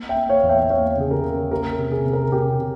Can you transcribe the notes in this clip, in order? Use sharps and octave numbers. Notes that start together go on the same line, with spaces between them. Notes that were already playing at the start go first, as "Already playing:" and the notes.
Already playing: A#3
E5 G5
A#3
C#5 F5
E2
E5 G5
E5
A#3 C#5 F5
C#3 G#4
G4 A#4
C#3
A#3 G4 A#4
C3
G#4
C3
A#4
G#4
C3 G4
C3